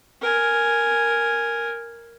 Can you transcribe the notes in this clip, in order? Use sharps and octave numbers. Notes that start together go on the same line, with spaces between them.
A#4 G#5